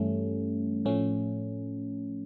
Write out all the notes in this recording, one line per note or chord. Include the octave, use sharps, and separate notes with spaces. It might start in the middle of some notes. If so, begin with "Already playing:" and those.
Already playing: G2 E3 G3 A3 C#4
A2 F3 A3 C#4